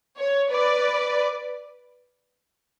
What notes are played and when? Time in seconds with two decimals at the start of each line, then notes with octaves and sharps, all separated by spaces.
0.17 C#5
0.51 B4 D5